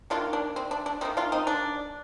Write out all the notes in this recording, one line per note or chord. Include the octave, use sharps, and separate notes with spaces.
D#3 A#3 D4 F4
D4
C4
D4
D4
D#3 A#3 C4 D#4
D4 F4
C4 D#4
D4